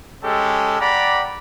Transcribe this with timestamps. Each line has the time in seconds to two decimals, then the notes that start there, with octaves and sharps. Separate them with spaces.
0.23 G#3 C#4 G4 A4
0.80 D5 F#5 G5 A#5 B5